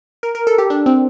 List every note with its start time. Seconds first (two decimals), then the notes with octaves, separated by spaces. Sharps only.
0.23 A#4
0.35 A#4
0.47 A4
0.58 G4
0.70 D4
0.86 C4